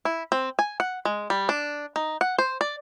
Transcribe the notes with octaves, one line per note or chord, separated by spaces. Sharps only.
E4
C4
G#5
F#5
G#3
G3
D4
D#4
F#5
C5
D5